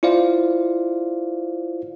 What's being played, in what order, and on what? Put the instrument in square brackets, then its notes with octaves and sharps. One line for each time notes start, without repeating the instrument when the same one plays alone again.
[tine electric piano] E4 F4 C5 D5 F5